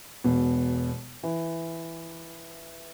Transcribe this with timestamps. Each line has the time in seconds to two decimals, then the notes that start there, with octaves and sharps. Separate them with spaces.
0.24 E1 B2
1.23 E3